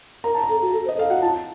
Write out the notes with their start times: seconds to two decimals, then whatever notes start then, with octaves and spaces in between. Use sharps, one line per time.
0.24 A#4 A#5
0.35 A5
0.43 A#5
0.49 A4
0.62 F#4
0.73 A4
0.85 C5
0.88 D#5
0.97 A4 F5
1.09 F#4 F#5
1.21 F4 A5